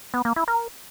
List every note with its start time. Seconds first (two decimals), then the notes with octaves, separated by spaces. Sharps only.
0.14 B3
0.25 A#3
0.36 E4
0.48 A#4